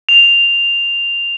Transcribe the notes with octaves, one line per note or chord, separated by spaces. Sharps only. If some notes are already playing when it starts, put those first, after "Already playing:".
F7